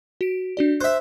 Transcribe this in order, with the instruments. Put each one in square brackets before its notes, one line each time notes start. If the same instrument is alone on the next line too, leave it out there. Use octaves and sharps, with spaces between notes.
[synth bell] F#4 D7
D4 F#4 D5
[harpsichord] C5 E5 [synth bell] E6 F#6